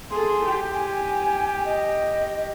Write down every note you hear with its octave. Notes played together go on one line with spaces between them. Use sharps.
G#4 A4 C6
G4
G#5
D#5